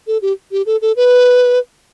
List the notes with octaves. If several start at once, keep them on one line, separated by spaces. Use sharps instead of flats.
A4
G4
G4
A4
A4
B4